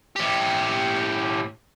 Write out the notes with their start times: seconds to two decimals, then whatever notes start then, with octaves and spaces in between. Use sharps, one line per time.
0.16 A2 G4